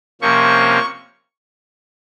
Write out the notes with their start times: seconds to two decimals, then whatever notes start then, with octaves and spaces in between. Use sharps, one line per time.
0.21 C3 F3 A#3 C#4 C#6